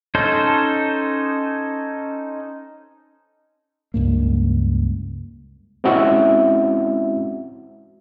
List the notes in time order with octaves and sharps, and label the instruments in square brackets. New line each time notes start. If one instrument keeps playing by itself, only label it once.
[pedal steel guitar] C#4 D#4 A4 C5
[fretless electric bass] C#2 G2 A#3
[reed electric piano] G#3 C4 C#4 E4 F#4 E5